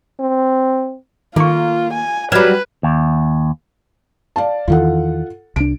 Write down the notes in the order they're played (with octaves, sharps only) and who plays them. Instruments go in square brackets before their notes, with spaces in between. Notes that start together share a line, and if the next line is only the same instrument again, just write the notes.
[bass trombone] C4
[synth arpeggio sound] D#3 C#6 [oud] A#3 [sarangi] F4
[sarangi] G#5
[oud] F#3 G3 [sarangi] B4 [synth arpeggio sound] F6 G#6 E7
[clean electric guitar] D#2
[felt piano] D5 F5 A5
[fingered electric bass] E2 D#3 E3 [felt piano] F4 A4 F#5
[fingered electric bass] C2 D4 [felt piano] D7